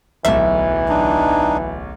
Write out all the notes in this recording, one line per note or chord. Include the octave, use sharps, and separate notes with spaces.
D1 B1 E3 A4 E5
D4 D#4